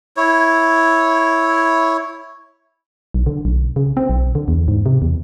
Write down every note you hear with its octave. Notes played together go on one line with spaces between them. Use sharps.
E4 C#5
B1
D3
B1
C#3
C4
B1
D3
E2
G#2
C3
E2